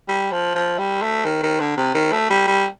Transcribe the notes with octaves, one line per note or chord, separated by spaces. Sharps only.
G3
F3
F3
G3
A3
D#3
D#3
D3
C3
D#3
A3
G3
G3